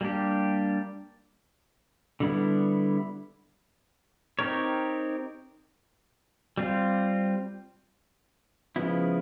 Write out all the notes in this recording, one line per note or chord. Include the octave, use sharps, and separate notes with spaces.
G3 A#3 D4 G4
D3 G3 B3 E4
C4 D#4 G4 A#4 C#5
G3 C4 F4
C#3 F3 G#3 B3 E4